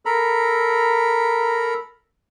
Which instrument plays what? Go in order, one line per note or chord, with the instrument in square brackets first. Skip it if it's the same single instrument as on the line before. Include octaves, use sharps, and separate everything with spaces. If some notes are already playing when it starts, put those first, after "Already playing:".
[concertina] A4 A#4 A#5 B5